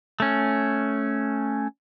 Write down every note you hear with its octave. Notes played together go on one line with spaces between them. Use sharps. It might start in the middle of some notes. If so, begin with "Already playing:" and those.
A3 C#4